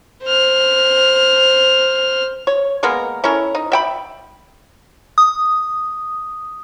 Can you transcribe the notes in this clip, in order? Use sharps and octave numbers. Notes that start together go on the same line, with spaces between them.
C5 F6
C#5
G#3 A#3 B3 A#4
C#4 E4 A4 A#4
D#4
E5 G5 B5
D#6